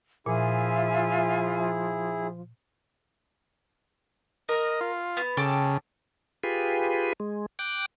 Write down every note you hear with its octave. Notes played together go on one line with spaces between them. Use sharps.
A#2 F3 E4 F4 G#4 E5 G#5
A#4 D#5
F4
B3
C#3 A4 G5 D6
F4 G4 G#4 B4
G#3
G5 D6 F#6